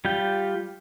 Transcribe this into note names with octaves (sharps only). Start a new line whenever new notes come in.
G3 F4 G4 G5